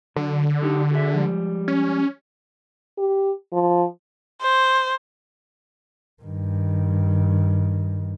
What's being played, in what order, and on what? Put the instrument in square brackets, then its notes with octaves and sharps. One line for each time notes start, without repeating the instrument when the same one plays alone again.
[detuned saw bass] D3 [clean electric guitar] F#3
[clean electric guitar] F#3 D#4 G4
F#4 G#4 E5
F3 G3 G#3
[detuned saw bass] C#4
[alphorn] G4
F3
[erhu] C5
[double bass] G2 D#3